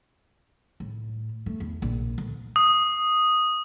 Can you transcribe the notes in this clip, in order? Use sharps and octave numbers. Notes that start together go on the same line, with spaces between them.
A2
A3
E2
A#1
D2
D#6